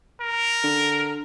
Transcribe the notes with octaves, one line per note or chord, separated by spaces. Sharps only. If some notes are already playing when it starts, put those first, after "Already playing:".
A#4
D3